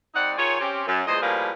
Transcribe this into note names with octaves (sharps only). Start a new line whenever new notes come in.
G3 C4 D#4 D5 F#5
D#3 F4 G#4 C#5
C4 C#4 G4
F#2
E2 A#2 G#3 C5 D#5
A2 F3 G3 A#3 G#4 B4